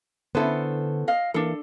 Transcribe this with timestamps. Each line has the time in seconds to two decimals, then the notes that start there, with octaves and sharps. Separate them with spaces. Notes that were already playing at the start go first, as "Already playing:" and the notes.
0.35 D3 B3 C#4 E4 A4 C5
1.08 D#5 F5
1.34 E3 A#3 D4 A4